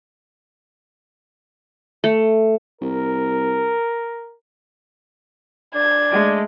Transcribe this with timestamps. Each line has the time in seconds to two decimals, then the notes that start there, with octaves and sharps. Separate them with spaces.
2.04 A3
2.81 C2 A#4
5.75 D4 G#6
6.11 G#3 A3